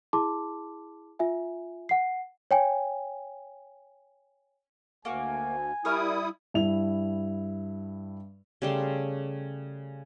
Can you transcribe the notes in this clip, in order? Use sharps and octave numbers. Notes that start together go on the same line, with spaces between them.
E4 G#4 A5 C6 D6
F4 E5 G#5
F#5 C7
C#5 G5 G#5
D2 A#3 F#4 F5 G#5
G3 E4 A#4 C#6 D#6 F6
G2 E4 F7
C#3 G3 A3 C6